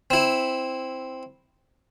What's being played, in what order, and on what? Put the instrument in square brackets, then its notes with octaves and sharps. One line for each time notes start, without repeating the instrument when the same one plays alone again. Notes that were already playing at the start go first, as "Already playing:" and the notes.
[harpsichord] C4 E4